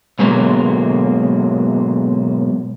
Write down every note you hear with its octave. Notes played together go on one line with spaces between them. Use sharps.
G#2 B2 D3 F#3 G#3 A#3